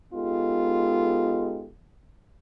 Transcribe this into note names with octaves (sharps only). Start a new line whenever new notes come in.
G#3 B3 D#4 F4 G4 A4